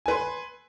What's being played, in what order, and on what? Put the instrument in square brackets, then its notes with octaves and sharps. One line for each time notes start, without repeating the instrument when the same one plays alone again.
[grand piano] G#5
B4
C6